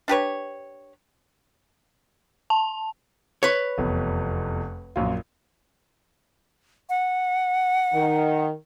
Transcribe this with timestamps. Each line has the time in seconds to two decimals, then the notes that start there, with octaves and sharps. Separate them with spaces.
0.08 D4 G4 B4 C#5
2.50 A5
3.43 B4 C#5
3.78 F1 E2
4.96 A#1 F#2 F4
6.89 F#5
7.93 D#3